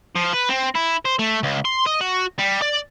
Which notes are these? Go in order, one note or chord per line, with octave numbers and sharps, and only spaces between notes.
F3
B4
C4
E4
C5
A3
C#2
C6
D#5
F#4
G3
D5